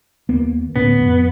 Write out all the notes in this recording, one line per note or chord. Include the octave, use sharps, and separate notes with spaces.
D#2 A#3 B3
D2 A2 B3 C#4
F2